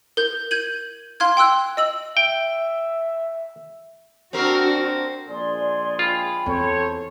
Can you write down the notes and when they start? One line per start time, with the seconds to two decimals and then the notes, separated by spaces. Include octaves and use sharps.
0.17 A#4 G6
0.51 G6 G#6 D#7 F#7
1.20 F5 C6 F6 G#6
1.37 G5 C6 E6 F#6
1.77 D#5 E6 F#7
2.17 E5 G5
4.33 C4 D4 F#4 A#4
5.28 A#1 G#3 G#4 D5 C6
5.99 F4 G5 B5
6.46 E2 C4 A4 C5 C#5